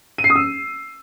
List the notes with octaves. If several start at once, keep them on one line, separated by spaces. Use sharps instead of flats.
D#7
C7
D#6
E6